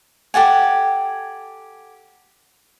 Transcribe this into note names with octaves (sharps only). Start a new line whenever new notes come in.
G4 A4 F#5 G#5